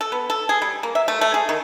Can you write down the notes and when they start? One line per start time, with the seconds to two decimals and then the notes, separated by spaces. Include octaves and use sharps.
0.01 A4
0.12 B3
0.30 A4
0.49 G#4
0.62 G3
0.83 A#3
0.95 E5
1.08 A3
1.21 A3
1.34 G#4
1.49 D#3